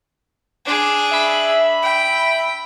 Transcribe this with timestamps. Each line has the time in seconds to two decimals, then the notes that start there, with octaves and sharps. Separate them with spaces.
0.66 D4 G#4
1.11 E5 B5
1.83 G5